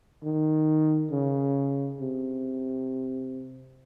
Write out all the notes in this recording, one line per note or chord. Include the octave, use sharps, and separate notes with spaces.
D#3
C#3
C3